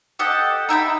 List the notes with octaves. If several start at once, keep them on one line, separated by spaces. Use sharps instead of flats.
G4 A4 D#5 F#5
D#4 E5 G5 B5